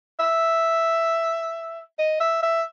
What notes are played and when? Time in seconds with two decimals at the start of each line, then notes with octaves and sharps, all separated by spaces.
0.19 E5
1.99 D#5
2.20 E5
2.43 E5